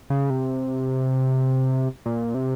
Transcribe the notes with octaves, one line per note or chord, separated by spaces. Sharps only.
C#3
C3
A#2
C3